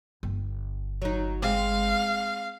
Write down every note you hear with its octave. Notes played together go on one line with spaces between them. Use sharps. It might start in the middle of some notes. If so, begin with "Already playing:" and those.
G1
F#3 D#4
G#3 C4 F5